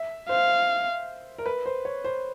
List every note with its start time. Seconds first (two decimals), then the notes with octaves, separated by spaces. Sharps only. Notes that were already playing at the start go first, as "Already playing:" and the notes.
Already playing: E5
0.29 C5 F5
1.38 A#4
1.46 B4
1.66 C5
1.85 C#5
2.04 C5